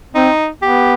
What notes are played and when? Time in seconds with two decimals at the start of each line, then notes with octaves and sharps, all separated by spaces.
0.15 C4 D#4
0.62 B3 G4